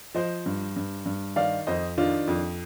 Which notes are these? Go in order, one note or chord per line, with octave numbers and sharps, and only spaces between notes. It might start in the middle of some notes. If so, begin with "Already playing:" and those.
F3 C5 D#5
G2
G2
G2
D#3 D5 F5
F2 C5 D#5
D#3 D4 F4
F2